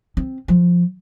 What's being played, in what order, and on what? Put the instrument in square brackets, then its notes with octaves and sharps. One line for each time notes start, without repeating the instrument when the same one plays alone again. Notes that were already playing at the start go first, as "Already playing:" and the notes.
[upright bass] C4
F3